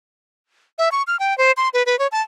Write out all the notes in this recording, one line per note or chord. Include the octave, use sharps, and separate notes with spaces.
E5
C#6
F6
G5
C5
C6
B4
B4
C#5
A5